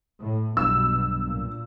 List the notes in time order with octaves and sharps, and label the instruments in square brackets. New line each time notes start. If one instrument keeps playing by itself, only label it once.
[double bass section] A2
[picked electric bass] B1 G2 [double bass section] B2 [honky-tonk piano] E6
[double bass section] A#2